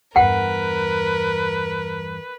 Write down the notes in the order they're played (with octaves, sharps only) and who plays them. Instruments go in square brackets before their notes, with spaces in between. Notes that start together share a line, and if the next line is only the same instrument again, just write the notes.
[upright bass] E2 G2 [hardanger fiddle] A#4 [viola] B4 [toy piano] F#5 G5